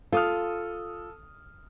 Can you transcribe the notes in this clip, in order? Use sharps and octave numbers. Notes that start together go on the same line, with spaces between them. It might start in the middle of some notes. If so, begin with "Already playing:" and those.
F4 A4 D#6 F6